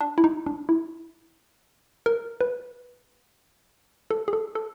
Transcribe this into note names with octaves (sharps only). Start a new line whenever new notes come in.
D4
E4
D#4
D4
E4
A#4
B4
A4
G#4
A4
A4